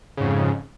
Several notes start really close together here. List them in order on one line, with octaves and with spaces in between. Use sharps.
C#3 G#2 F2